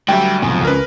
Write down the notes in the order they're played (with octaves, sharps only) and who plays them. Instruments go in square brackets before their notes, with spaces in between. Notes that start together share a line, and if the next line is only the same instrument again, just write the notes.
[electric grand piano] D2 F#3 [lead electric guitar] G3 [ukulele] E5 G5
[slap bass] F1 B1 G#2 [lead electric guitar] F2 [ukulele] G#5
[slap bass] C#2 F#3 C#4 [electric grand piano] A#4 B4